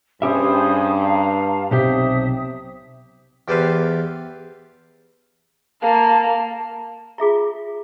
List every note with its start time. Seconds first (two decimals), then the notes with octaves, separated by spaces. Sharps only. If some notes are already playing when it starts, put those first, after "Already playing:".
0.22 G2 C#4 G4 G#4 C5 E5 B5 D#6
1.04 F5 A5 A#5
1.71 B1 C3 G4 C5 E5 D#6
3.48 E2 G4 A4 B4 C5 F5
5.82 A#3 F5 A5
7.18 F4 G#4 E5 A#5